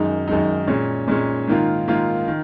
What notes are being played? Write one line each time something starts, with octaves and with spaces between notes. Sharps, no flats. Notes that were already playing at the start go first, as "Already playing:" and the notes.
Already playing: F#2 D#3 G#3 D#4
F#2 D#3 G#3 D#4
A#2 G#3 C#4
A#2 G#3 C#4
G#2 D#3 A#3 F4
G#2 D#3 A#3 F4
D#3